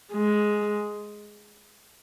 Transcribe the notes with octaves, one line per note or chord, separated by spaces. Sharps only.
G#3